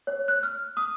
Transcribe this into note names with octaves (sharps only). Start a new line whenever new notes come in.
C#5
F#6
F6
D#6